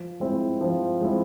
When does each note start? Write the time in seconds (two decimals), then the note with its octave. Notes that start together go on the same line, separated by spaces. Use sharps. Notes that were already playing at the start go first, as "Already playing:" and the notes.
Already playing: F3
0.20 G#3 C4 E4
0.61 F3
1.01 G#3 C4 E4